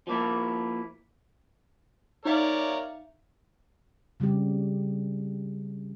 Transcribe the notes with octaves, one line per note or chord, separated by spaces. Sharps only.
F3 A#3 E4
D#4 A#4 C#5 D5 E5 F5
C#3 G3 C4 G4